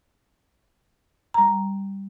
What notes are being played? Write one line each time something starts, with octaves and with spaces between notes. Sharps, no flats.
G3 A#5